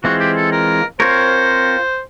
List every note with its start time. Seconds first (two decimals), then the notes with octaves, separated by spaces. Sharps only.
0.03 E3 G#3 C4 F4 F#4
0.20 G4
0.36 A4
0.52 A#4
1.00 C4 F4 A#4 C5 C#5